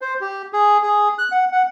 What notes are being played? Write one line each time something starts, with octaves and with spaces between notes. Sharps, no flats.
C5
G4
G#4
G#4
F#6
F#5
F#5